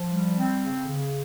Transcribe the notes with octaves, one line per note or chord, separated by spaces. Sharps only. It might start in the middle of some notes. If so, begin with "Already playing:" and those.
Already playing: F3
G3
C4
C#3
C#3